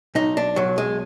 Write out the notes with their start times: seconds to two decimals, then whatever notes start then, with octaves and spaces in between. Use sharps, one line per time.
0.15 B1 D#4
0.37 D4
0.56 B1 F#3
0.78 G#3